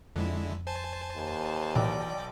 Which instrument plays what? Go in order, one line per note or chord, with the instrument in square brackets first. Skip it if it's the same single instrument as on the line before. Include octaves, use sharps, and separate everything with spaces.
[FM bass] F2 [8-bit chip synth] D3 G#3 E4
[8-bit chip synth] C5 G#5 A5
[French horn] D#2
[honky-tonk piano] B1 [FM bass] E3 [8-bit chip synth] D5 G5 D6